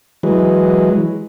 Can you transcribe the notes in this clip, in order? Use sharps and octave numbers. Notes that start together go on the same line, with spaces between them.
E3 F#3 G#3